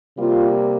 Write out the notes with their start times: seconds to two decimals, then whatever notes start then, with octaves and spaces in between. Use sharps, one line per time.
0.17 C3 G3 A#3 F4